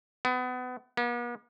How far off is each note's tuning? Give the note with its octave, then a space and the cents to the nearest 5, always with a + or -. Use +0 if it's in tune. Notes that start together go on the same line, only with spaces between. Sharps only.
B3 +30
B3 -45